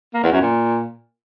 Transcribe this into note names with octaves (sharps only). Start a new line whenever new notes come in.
A#3
E2
F#2
A#2